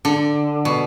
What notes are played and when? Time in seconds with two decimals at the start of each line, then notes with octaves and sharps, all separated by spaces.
0.05 D3
0.65 B2